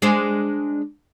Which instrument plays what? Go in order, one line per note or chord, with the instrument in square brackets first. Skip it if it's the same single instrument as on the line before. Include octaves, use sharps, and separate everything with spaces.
[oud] G#3 D4 C5